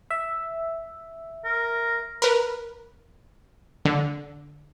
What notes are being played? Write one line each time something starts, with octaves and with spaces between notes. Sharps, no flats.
E5
A#4
A#4 B4
D3